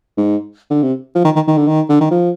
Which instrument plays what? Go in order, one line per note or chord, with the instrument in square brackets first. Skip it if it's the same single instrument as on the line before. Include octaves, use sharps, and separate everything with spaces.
[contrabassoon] G#2
D3
C3
F3
D#3
D#3
D#3
D3
D#3
D3
D#3
F3